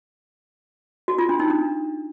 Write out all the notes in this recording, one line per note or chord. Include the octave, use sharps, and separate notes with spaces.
F#4
F4
D4
D#4
D4